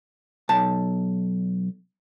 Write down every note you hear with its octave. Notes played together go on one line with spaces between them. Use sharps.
B1 A5